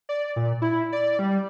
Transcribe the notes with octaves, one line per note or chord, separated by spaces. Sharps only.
D5
A#2
E4
D5
G3